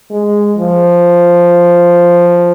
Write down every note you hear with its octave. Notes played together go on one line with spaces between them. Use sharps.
G#3
F3